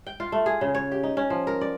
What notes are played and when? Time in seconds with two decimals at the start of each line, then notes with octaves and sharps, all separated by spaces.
0.07 G5
0.20 F4
0.32 A3
0.46 G#4
0.61 C#3
0.75 C#5
0.92 G4
1.03 D#4
1.17 C#4
1.30 F3
1.47 A#4
1.61 D5